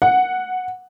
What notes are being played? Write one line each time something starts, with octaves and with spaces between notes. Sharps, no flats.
F#5